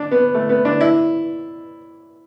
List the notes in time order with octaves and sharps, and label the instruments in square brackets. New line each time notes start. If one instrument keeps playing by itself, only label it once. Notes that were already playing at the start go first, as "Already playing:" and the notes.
Already playing: [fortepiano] D4
B3
A3
B3
D4
E4